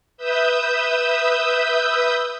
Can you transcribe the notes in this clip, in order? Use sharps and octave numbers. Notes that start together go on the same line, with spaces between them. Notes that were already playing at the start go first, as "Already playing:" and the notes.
B4 E5 D#6 E6 G6